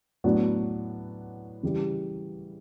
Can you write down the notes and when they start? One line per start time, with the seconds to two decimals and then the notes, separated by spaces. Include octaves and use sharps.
0.24 A2 F#3 B3 D4 F#4
1.63 C#3 E3 G3